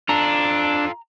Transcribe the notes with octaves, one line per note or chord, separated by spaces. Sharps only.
D4 F4 A4 A#5